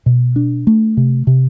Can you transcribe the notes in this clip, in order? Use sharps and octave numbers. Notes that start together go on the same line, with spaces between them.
B2
D4
A3
C3
C3